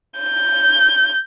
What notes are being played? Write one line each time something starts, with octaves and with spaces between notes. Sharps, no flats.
G6